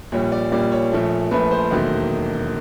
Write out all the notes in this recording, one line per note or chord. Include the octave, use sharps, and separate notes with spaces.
A#1 A#2 G3 C#5
D5
A#1 A#2 G3 D5
C#5
A#1 A#2 F3 A3
A#1 A#2 F3 A3 B4
C5
E1 D#2 D#3 F#3 A3